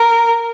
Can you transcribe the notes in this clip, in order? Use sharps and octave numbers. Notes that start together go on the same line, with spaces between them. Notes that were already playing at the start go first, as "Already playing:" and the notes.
Already playing: A#4